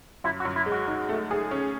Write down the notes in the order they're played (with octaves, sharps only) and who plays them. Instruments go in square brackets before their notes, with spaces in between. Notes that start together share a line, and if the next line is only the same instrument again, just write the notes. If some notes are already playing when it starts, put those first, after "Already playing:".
[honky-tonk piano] F#2 [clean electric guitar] E4
[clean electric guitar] F#4
[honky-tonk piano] F#2
[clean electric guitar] E4
[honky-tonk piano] G#3
[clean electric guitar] F#4
[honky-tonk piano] D#4
A3
G#4
C#4